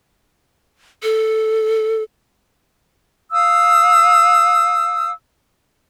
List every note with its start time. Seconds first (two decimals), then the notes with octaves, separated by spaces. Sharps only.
1.03 A4
3.32 F5 D#6 E6